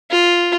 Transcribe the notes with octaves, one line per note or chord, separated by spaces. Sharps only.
F4